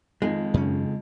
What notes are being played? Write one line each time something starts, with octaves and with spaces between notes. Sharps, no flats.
F2 D#3 G#3
F#2 C#3 C#4